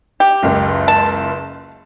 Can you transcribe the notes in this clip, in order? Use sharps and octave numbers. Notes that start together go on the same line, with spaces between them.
G4
F#1 C#2
A5